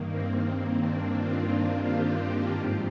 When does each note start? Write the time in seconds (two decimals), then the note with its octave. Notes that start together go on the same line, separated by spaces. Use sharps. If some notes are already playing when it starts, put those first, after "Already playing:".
Already playing: G2 D#3 A#3
0.09 C4
0.80 D4
1.15 F4
1.85 G4
2.55 G#2 F3 C4